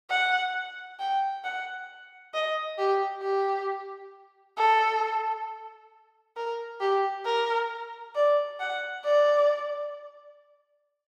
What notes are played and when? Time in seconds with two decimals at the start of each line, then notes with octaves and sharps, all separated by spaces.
0.10 F#5
1.00 G5
1.44 F#5
2.34 D#5
2.78 G4
3.23 G4
4.57 A4
6.37 A#4
6.81 G4
7.25 A#4
8.15 D5
8.60 F#5
9.04 D5